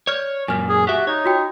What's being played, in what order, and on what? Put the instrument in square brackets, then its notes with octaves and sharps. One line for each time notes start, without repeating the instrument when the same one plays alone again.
[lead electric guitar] C#5 [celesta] D5 F6
[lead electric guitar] F#2 A#2 [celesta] G#5 F6
[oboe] G#4
[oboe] F#4 [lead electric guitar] G4 E5
[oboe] D#4 [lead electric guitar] C#5
[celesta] F4 F#4 G5